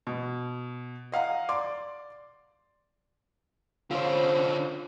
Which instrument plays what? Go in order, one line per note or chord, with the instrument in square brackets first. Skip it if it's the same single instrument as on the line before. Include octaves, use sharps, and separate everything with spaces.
[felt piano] B2
D#5 F5 F#5 A#5
D5 C6 D6
[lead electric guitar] D3 C#4 [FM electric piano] F4 C5